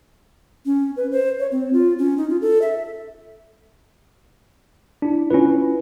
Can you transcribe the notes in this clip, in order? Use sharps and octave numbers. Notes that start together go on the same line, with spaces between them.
C#4
B4
C5
C#5
C4
F4
C#4
D#4
F4
A4
E5
D4 E4
C#4 E4 F4 B4